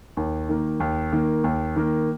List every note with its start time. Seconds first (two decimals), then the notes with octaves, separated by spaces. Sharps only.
0.17 D#2
0.49 D#3 A#3
0.80 D#2
1.13 D#3 A#3
1.44 D#2
1.76 D#3 A#3